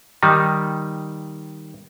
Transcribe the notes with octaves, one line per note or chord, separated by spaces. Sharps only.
D#3 G3 D#4